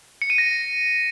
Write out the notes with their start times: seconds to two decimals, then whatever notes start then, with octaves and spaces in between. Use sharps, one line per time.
0.22 C#7
0.30 D#7
0.38 A#6